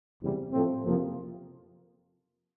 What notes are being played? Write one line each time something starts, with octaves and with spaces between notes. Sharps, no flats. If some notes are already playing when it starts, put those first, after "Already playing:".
F#1 E2 C3 E3 G3
A2 F3 A3 C4
F#1 F2 C3 F3 A#3